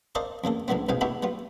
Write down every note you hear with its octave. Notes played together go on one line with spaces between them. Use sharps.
A4 A#4 C5 D5 D#5 F5
E2 C#3 A#3 A4
C#2 D3 F3 G3 B3 C4
C2 G#2 B2 F5 G5 G#5
B3 D#4 E4 F#4 G4 A4
G3 B3 F4